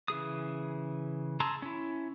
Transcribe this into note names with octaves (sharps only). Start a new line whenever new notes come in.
C#3 E3 G#4 D#6
G#4 A5 A#5 C6 E6
C#4 E4